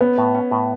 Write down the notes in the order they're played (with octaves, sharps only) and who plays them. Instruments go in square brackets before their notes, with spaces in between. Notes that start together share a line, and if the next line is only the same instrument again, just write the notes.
[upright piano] B3 [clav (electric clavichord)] C#4
[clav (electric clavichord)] A2
C#4
A2